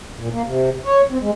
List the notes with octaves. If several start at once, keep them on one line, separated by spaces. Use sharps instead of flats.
A#2
A#3
C3
C#5
C4
G#3